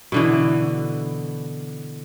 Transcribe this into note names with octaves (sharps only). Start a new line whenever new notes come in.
B2 D3 E3